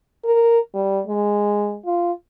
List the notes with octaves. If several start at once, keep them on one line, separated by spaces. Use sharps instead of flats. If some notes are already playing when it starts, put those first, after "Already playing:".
A#4
G3
G#3
F4